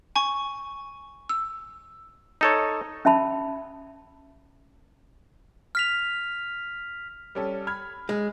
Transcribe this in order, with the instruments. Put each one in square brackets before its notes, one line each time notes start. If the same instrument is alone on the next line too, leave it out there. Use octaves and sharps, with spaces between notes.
[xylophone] G#5 C#6
E6
[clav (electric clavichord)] D#4 A4 C#5
[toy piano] C#4 E5 A5 B5
[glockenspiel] F6 B6 F7
[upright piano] G3 C#4 A4
B5 F6 G#6
[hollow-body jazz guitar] G#3